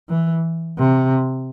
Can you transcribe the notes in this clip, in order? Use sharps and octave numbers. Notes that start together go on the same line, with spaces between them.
E3
C3